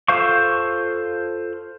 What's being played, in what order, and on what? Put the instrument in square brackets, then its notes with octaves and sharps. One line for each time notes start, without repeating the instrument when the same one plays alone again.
[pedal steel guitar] F4 A4 C5 F5 C#6